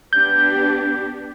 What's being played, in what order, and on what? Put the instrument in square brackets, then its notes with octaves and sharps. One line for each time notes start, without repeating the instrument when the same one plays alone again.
[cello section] B3 D4 G4 [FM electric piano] G6